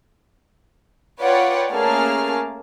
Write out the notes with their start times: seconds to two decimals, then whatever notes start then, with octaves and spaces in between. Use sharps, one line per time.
1.20 F4 B4 C#5 D5 F#5 G5
1.71 A3 A#3 C#4 G#4 A5 F6